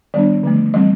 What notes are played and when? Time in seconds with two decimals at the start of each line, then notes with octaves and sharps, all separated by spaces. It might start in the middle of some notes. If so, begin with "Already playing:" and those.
0.14 D#3 G3 B3 D4 D5
0.43 D3 F3 A3
0.74 E3 G3 C4 D#5